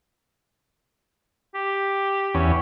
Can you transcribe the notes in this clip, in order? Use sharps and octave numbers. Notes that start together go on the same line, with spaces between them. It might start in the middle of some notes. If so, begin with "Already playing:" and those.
G4
E2 C#4